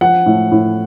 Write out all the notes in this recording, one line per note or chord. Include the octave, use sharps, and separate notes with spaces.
F3 F#5
A2
A2